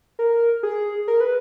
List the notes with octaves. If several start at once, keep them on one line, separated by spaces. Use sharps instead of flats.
A#4
G#4
A#4
B4